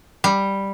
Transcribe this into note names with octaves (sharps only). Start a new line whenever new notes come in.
G3